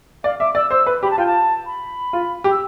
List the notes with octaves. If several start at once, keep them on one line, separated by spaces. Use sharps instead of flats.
D5 F5
E5 D6
D5 E6
C5 E6
B4
G4 B5
A5
F4 G5
A5
B5
F4
G4
E6